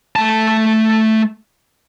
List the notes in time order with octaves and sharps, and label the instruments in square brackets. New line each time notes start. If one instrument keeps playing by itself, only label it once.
[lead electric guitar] A3 A5